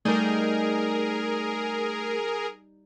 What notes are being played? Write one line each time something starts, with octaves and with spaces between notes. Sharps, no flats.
G3 A3 D#4 G#4 A#4